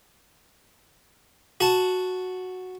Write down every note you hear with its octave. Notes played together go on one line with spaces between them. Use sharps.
F#4 F#5 A5